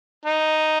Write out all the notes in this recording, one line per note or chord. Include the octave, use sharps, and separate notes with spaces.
D#4